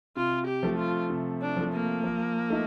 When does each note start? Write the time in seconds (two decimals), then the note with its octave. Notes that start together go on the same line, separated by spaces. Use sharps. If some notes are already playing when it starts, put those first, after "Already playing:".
0.16 C3 F4
0.47 G4
0.63 F3 A3
0.78 F4
1.10 C3
1.41 D4
1.57 F3 A3
1.73 A#3
2.04 F3
2.50 A3 D#4